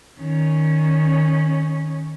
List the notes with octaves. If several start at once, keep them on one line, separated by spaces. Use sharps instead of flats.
D#3 C#4